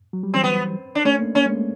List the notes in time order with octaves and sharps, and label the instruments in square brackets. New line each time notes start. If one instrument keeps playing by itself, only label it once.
[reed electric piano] F#3
G3
[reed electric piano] E3 [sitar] C4
[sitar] B3
D4
[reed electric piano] A3 [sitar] C#4
[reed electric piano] A#3
[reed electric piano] A#3 [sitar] C#4
[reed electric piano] G#3
A3